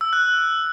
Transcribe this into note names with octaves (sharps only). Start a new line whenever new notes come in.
E6
F#6